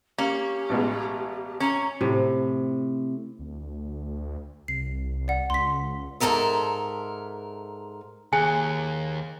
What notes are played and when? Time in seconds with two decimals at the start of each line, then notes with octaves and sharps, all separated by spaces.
0.18 A#3 C#4 G4
0.69 A1 B2 G#3
1.60 C#4 A#5
2.01 A2 C3
3.39 D2
4.68 C2 C7
5.28 D5 F#5
5.50 C#2 C6 B6
6.20 G#2 E3 A4 A#4 E5
8.33 D#2 G#4 G#5 F#6